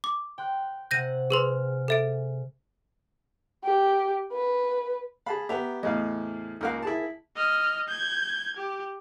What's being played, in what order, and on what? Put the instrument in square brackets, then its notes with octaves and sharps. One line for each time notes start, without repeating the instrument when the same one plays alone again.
[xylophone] D6
[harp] G5 C6 F#6
[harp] C3 F#5 [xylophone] G6 A#6 D#7
[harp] G#3 F6 [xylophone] G#4 B4 C6
[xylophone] A4 E5 D7
[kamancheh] G4
B4
[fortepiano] G#4 A5 B5 [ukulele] F5
[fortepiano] B3 G4 [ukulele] E5 A#5
[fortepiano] E2 A2 F5 [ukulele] C5 D#5
[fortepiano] C#2 A#3 F#6 [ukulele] D#4 A#4 F5
[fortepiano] E4 G#4 A5
[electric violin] D#5 F6
G6 G#6
G4